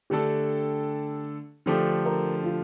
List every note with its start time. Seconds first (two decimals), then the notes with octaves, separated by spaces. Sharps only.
0.10 D3 A3 D4 G4 A4
1.66 D3 F3 A3 D4 G4 A4
2.06 A#4
2.44 F4